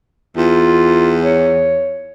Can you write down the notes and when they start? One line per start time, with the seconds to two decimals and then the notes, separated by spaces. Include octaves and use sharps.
0.37 E2 F4
1.24 C#5